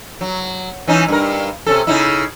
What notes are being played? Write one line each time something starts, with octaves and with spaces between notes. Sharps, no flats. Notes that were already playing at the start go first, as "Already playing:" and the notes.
F#3
E3 C#4 D#4
G2 A#4
C3 C#4 A4
C#3 D#4 E4